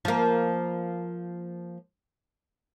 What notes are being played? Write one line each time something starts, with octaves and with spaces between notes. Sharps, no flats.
F3 A#3